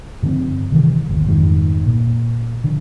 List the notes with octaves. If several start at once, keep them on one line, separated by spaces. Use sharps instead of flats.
G2 D3 F3 C4
C3 D#3 E3 G3
G1 D#2
F2 G#2 D#3 G3
A#2
D3 F3